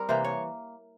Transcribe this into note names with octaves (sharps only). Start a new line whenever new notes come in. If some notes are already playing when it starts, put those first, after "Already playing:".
Already playing: G3 C4 A#4
C3 E3 A#3 C5
C#5